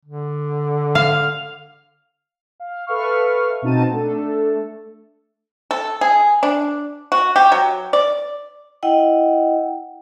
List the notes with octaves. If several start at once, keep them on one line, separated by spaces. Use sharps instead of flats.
D3
F5
F5
A4 B4 E5 F5 C#6 F6
B2 C4 D#4 F#4 A5 D#7
A3 D4 A4
A4
G#4
D4
F#4
G4
F#3
D5
E4 D#5 F#5 G5